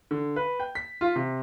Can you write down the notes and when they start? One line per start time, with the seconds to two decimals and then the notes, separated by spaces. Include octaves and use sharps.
0.11 D3
0.36 B4
0.60 G5
0.75 B6
1.01 F4
1.16 C3